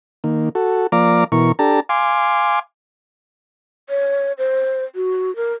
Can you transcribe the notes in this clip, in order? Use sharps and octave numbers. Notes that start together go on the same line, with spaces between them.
D#3 A#3
F#4 A4
F3 A#3 D5 F5 A#5 D6
B2 E3 A#4 C#6
D4 G4 A4 A5 A#5
F5 G#5 C6 D6
C#5
C5
F#4
A#4